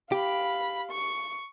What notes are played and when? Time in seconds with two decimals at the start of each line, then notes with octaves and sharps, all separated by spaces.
0.12 G4 F5 B5
0.91 C#6